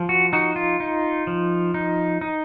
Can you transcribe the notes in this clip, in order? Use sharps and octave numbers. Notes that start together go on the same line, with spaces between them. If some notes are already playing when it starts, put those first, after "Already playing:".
Already playing: F3
F#4
D#4 F#4
F4
D#4
F3
D#4
D#4